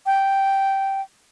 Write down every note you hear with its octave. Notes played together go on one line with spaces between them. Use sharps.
G5